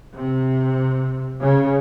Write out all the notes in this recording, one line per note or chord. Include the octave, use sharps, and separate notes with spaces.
C3
C#3